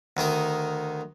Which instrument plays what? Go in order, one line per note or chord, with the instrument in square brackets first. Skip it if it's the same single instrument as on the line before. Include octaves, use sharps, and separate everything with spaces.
[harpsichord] D2 D#3 D#4 A#4